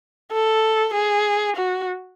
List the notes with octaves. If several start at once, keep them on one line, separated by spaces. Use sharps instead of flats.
A4
G#4
F#4